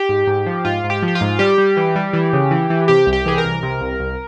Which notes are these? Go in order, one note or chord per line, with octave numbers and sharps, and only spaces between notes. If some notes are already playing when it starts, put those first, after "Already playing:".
Already playing: G4
G#2
G#2
F3
G#2 F4
G#2
G4
F3
G4
F4
G#2
G3 G4
G3
E3
G3
E3
C#3
E3
E3
C3 G4
C2
G4
E3 G#4
A#4
C2
C3
C2
C2